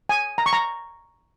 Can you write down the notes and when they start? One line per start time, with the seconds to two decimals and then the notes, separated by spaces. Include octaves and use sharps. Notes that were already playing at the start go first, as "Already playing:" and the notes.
0.09 G#5
0.38 A#5
0.46 C#6
0.53 A#5